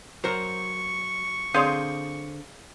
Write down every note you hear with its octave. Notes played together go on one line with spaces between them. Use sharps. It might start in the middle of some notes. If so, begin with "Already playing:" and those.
F#3 A#4 C5 C#6
D3 C4 G#4 C#5 F5 C6 D#6 G6